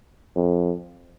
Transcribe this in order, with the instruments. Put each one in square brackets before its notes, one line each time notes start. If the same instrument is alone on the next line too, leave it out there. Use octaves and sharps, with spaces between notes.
[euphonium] F2